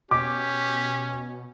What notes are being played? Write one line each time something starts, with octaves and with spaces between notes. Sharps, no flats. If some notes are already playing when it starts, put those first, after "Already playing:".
B2 C#4 G4 D6